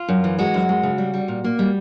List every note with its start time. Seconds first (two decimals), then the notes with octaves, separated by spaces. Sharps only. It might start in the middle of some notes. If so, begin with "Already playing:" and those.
Already playing: F4
0.08 F#2
0.24 E3
0.39 G#3 F#4
0.54 F#2
0.69 G#3
0.83 C#3
0.98 G3
1.14 G3
1.28 A#2
1.44 A#3
1.59 G3